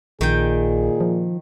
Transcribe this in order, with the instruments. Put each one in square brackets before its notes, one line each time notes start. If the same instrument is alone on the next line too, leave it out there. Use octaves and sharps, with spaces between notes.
[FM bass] A#1 [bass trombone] A#2 [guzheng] D#3 G5 [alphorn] G#4
[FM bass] F3